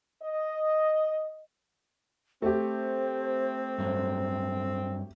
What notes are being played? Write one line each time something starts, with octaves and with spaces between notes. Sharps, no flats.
D#5
A3 C4 G4 C5
G2 F#3